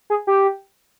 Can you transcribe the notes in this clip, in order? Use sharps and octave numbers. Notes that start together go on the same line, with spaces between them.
G#4
G4